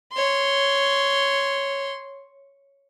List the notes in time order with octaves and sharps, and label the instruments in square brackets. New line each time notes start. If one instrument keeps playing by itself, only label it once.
[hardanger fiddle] C#5 C6